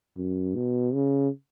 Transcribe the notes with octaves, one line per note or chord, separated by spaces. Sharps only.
F#2
B2
C#3